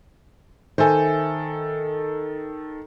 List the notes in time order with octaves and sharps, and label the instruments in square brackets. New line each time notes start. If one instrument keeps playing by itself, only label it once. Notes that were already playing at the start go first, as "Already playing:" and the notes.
[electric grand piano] D#3 A4 [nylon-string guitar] C5 E5 G#5